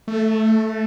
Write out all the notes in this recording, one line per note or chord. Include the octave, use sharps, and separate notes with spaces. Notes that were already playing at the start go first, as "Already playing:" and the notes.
A3